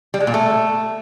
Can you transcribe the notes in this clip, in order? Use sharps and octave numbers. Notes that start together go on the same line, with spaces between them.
G3
G#3
A#2
A3